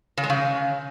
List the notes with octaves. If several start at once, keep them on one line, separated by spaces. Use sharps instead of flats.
C#3
G#3
C#3